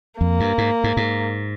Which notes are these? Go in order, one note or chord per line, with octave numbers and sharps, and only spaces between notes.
F2 A#3
G2
G#2
G#2
G#2